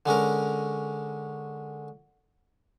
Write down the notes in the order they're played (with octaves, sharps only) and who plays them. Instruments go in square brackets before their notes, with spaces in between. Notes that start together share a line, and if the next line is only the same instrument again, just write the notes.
[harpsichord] D3 G#3 C#4 A#4